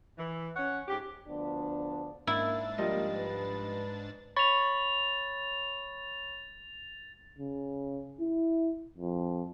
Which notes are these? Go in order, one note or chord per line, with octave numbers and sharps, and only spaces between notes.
E3
C#4 C#5 F#5
G#2 G4
D2 F3 B3 D4
G#2 A#3 D4 E4 A6
F3 G3 A#3 D#5
B4
C#5 B5 C#6 A6 F7
C#3
E4
F2